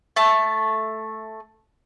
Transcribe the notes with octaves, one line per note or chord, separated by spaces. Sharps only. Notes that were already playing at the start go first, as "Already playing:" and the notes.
A3 A5